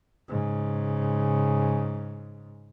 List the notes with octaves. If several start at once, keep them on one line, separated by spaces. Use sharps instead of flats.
G#2 C#3